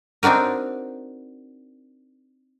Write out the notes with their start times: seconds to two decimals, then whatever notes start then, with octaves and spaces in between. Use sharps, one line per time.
0.23 C4 D4 D#4 F#4 A#4